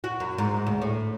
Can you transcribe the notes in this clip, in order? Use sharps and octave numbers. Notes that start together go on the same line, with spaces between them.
F#4
F#2
G#2
D2
A2